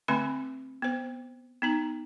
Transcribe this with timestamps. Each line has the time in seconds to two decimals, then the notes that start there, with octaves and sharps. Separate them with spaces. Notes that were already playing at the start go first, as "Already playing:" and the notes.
0.08 D3 A3 C4 G#5 B5
0.82 B3 C5
1.62 B3 D#4 A#5